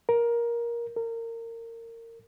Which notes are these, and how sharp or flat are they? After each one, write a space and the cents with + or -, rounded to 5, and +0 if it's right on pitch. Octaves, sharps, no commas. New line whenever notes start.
A#4 +15
A#4 -25